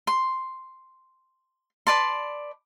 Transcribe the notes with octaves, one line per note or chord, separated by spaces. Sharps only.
C6
B4 D5 A5 C6